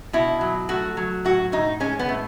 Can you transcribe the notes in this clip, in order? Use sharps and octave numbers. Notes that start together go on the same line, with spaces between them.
B2 E4
F#3
A3 F#4
F#3
A2 F#4
A2 D#4
G#3 C#4
B3
A2